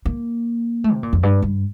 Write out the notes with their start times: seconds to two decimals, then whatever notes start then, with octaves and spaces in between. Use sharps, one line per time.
0.05 A#3
0.84 A3
0.93 C3
1.03 A#2
1.13 F2
1.23 G2
1.42 G2